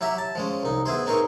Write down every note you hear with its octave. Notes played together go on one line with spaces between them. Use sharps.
F#3 E4 G4 E5 A#5
A5
F3 G#3 C#4
C2 D#4
B3 E4 G#4 C5
C4 D#4 G#4 A#4 C#5